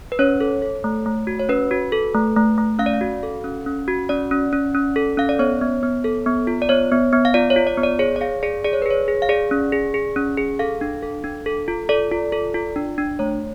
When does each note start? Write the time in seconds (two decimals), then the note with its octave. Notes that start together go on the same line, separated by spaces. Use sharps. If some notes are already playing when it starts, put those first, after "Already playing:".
0.12 B4
0.19 C#4 C#5
0.41 A4
0.62 A4
0.84 A3
1.06 A3
1.27 F#4
1.39 C#5
1.49 C#4 B4
1.71 F#4
1.92 A4
2.14 A3
2.36 A3
2.58 A3
2.79 C#4 F5
2.86 D5
2.94 F5
3.01 F#4
3.23 A4
3.44 C#4
3.66 C#4
3.88 F#4
4.09 C#4 D5
4.31 C#4
4.53 C#4
4.74 C#4
4.96 A4
5.17 C#4 F5
5.29 D5
5.39 B3 C#5
5.61 B3
5.83 B3
6.04 A4
6.26 B3
6.47 F4
6.62 D5
6.69 B3 C#5
6.91 B3
7.13 B3
7.25 F5
7.34 F4 D5
7.50 C#5
7.56 F4
7.67 D5
7.78 B3
7.83 D5
7.99 G#4 C#5
8.16 D5
8.21 G#4 F5
8.43 G#4 D5
8.64 G#4 D5
8.73 C#5
8.82 B4
8.86 G#4 C#5
9.08 G#4
9.22 F5
9.29 G#4 D5
9.51 C#4
9.72 G#4
9.94 G#4
10.16 C#4
10.37 G#4
10.59 A4 F5
10.81 D4
11.03 A4
11.24 D4
11.46 A4
11.68 F4
11.89 A4 D5
12.11 F4
12.32 A4
12.54 F4
12.76 D4
12.98 D4
13.19 A3 C#5